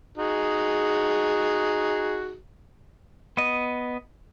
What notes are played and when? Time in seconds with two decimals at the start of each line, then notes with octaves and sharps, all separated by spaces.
0.18 D#4 F#4 G#4
3.37 B3 D#5